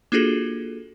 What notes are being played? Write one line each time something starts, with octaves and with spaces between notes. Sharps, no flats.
A#3 D4 F4 F#4 G#4 A4